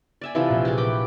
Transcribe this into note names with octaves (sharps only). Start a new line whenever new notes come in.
D5 E5 G#5
C3 E3 F3 E5 C#6 F6
A#1 A#2
G4 G#4
B4 G5 D6